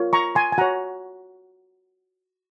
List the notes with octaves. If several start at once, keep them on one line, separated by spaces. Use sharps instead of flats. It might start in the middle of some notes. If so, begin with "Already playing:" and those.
Already playing: F4 A#4 C#5
A#5 C#6
G#5 C6
G#5
F#4 C#5 F#5 A#5